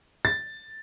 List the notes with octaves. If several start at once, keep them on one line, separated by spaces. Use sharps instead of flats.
A6